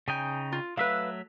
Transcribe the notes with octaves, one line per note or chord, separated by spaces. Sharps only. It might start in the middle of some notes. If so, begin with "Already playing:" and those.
C#3 D#4 G5 G#5
F4
F#3 A3 B4 E5 F5